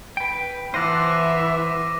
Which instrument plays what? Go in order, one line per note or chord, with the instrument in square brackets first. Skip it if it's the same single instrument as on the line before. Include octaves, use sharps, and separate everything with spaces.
[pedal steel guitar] B4 G5
[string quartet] E3 [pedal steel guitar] C5 F#5 A5 [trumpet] E5 [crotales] D6 A#6 D#7